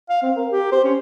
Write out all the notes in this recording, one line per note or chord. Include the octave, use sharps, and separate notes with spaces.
F5
C4
A#4
G4
C5
C#4